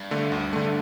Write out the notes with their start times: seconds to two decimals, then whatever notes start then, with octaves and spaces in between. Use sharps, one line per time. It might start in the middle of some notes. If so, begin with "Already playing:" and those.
Already playing: G2
0.11 D3 A3
0.32 D2
0.53 D3 A3